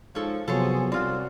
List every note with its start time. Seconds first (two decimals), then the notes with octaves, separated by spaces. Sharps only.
0.15 G#2 F3 A4 C#5
0.48 C3 F3 F#3 B3 G#4 A4 C5 C#5
0.92 C2 F#3 C4 F4 C5 D5